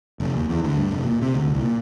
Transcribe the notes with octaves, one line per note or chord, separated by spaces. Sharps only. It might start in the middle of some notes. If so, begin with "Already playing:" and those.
F1
D#2
E2
D2
G2
F1
A#2
C3
D2
C2
A#2